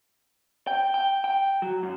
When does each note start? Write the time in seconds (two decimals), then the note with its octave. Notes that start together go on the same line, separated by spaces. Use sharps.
0.67 G5
0.94 G5
1.24 G5
1.62 F#3
1.83 F#2